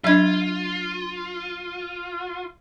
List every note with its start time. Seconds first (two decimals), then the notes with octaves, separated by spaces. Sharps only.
0.04 F#3 D4 F4 E5 G#6